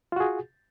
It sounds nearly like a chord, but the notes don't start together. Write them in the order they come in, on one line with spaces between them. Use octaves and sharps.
F4 F#4 G#4